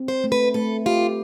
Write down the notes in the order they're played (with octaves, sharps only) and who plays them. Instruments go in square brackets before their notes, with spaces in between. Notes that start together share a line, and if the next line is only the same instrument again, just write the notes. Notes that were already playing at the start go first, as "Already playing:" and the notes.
Already playing: [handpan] C4
[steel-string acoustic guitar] C5
[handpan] A3
[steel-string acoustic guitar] B4
[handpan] A3 [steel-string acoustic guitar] A4
[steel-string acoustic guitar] F4 [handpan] G4